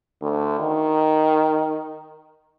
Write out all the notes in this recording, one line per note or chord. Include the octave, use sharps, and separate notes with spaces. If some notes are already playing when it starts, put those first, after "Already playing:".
D2
D#3